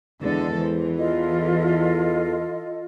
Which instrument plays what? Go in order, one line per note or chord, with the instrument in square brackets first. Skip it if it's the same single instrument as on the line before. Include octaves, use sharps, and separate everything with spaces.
[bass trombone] E2 [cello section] D3 G#3 A4
[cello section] E3 [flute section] C5
[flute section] F4 A4 D#5